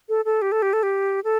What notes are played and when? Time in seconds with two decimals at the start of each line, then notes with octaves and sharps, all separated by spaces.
0.09 A4
0.25 A4
0.42 G4
0.52 A4
0.62 G4
0.73 A4
0.83 G4
1.24 A4